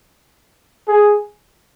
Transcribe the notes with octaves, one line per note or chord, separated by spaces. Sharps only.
G#4